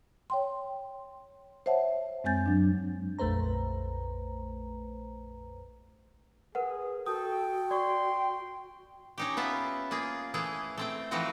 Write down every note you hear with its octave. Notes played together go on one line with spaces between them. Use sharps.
C#5 G5 C6
C5 C#5 E5 F#5 A5
F#2 G#3 C4 G#5 G6 A6
F#3 D4
A#1 F2 A3 B4 C5 A#5
G#4 A#4 B4 F#5
F#4 A4 G5 D#6
D5 C6 C#6
C#4 D#4 G4
B3 F4 E5 A5
A#3 F4 G#4
E3 A3 E4 G#4
A3 C4 G5
E3 F3 A3 C4 D#4 F#4